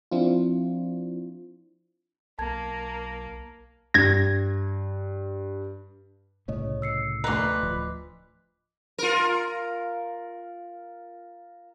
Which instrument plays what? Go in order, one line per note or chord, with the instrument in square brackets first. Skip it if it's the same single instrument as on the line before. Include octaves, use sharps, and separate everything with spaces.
[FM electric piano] F3 C4 D4 E4 F4
[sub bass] B1 [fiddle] A#3 [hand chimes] A5 G#6
[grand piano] G2 [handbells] G#6 A#6
[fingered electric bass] C2 A2 C#3 [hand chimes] C#5 D#5
[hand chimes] E6 C7 C#7
[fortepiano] D2 A#5 [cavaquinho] B4 C6 [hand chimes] D#5 D6
[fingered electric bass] D1 F3
[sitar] F4 A#4